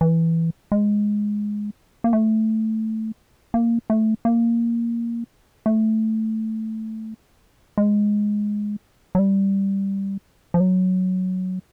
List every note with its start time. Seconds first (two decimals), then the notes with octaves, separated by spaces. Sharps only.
0.01 E3
0.72 G#3
2.04 A#3
2.13 A3
3.54 A#3
3.90 A3
4.25 A#3
5.66 A3
7.78 G#3
9.15 F#3
9.19 G3
10.54 F3
10.60 F#3